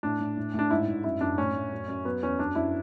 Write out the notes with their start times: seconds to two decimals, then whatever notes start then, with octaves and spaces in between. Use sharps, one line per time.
0.03 A2 D4
0.20 A2
0.37 A2
0.54 A2 D4
0.70 G#2 E4
0.87 G#2
1.04 F#2 E4
1.21 F#2 D4
1.38 A2 C#4
1.55 A2
1.72 F#2
1.88 F#2
2.05 F#3 B3
2.23 E2 C#4
2.39 F#2 D4
2.55 F#2 E4